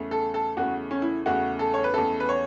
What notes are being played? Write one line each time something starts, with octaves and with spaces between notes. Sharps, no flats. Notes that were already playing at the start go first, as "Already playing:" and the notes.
Already playing: E2 C#3 A3
A4
A4
E2 C#3 A3 F#4
C#4
E4
E2 C#3 A3 F#4
A4
C#5
B4
E2 C#3 A3 A4
B4
C#5